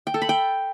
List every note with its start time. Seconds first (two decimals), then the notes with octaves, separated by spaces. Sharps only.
0.07 G5
0.14 A4
0.22 B5
0.29 G5